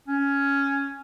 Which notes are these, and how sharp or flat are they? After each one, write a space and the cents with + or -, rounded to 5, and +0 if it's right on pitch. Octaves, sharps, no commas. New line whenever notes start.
C#4 +5